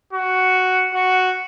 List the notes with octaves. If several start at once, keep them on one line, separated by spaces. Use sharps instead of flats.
F#4
F#4